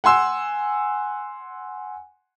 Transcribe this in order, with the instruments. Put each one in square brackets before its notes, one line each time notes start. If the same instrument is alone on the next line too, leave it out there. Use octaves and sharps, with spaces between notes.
[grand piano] F#5 G#5 C6 E6